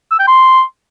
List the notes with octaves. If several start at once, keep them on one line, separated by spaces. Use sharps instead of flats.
E6
G5
C6